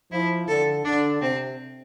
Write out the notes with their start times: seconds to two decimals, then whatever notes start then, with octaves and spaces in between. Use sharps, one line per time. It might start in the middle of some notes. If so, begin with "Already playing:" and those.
0.12 F3 E4
0.47 D3 A4
0.85 D3 D4
1.21 C3 C4